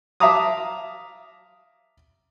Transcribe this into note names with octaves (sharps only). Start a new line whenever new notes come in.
E5 F5 A5 A#5 D6 D#6